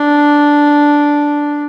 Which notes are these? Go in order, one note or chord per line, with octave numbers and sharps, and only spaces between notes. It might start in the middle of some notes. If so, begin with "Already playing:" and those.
Already playing: D4